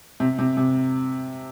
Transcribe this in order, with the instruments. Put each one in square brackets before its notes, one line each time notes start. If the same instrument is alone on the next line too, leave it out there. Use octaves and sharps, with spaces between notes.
[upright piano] C3
C3
C3